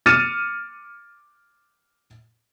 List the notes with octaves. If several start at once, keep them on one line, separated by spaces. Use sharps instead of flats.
D6 F6 A6 C#7 D#7 E7